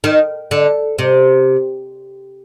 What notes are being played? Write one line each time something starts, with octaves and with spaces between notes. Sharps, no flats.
D#3
D3
C3